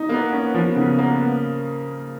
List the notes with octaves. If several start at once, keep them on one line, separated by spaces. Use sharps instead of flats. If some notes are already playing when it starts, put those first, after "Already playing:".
Already playing: D#4
A#3 B3
C#4
F3
C#3
A#3